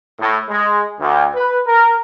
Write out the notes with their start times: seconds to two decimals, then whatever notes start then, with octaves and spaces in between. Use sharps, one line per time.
0.19 A2
0.48 G#3
0.99 D2
1.34 B4
1.66 A#4